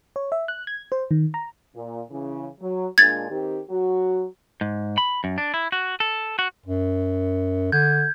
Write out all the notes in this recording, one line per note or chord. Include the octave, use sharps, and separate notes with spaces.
C#5
E5
F#6
G#6
C5
D#3
A#5
A#2
C#3 E3
F#3
A#2 G#3 D4 G#6 A6
D#3 C4 G4
F#3 F#4
G#2
B5
F#2
D4
E4
F#4
A4
F#4
F#2
D3 G6 G#6